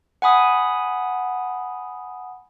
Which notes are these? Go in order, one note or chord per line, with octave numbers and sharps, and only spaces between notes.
F#5 G#5 B5 D#6